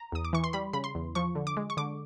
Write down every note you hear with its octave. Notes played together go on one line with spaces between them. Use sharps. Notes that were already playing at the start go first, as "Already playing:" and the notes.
Already playing: A#5
E2 D#6
D6
E3 C#6
C6
G3 B5
C#3 B5
C6
E2
F3 C#6
D3
D6
G#3
C#6
D3 D6